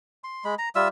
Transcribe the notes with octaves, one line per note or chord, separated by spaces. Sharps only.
C6
G#3 B5
A#5
G3 F4 E5 E6